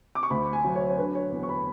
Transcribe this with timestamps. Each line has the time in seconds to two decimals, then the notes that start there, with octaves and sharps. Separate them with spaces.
0.15 D6
0.23 C#6
0.30 D2 B5
0.53 G#5
0.64 F#3
0.76 C#5
0.89 C#5
0.98 D3 B4
1.15 C#5
1.32 E2
1.43 C#6
1.49 B5